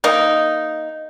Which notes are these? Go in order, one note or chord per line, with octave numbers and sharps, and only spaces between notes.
A#3 D#4